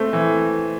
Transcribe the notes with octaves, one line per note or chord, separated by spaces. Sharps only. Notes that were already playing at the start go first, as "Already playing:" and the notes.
Already playing: A3 C4
E3